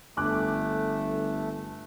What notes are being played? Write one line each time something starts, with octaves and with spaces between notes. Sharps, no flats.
G1 A3 G#5 D6 F#6